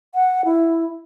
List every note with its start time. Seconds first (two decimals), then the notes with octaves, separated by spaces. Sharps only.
0.15 F#5
0.45 E4